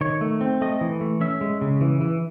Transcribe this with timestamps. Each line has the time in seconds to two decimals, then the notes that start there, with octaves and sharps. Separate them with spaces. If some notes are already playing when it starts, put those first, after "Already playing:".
0.01 D#3 C#5
0.21 A3
0.41 C4
0.61 A3 D#5
0.81 E3
1.01 A3
1.21 C#4 E5
1.41 G#3
1.61 C#3
1.81 E3
2.01 E3